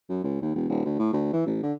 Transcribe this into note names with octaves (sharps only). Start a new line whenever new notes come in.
F#2
C#2
D#2
E1
D#1
D2
A2
D2
E3
A1
D3